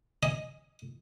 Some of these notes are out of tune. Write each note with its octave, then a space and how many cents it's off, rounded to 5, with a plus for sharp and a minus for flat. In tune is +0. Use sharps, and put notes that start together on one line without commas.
D#5 +0 G#5 +0